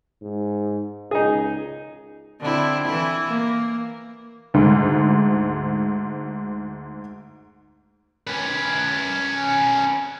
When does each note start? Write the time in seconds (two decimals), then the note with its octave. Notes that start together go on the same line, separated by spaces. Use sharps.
0.22 G#2
1.11 C#2 D#4 G#4
2.40 D3 C4 E4
2.85 E3 E4
3.27 A#3
4.54 D2 G#2
8.27 C#4 B4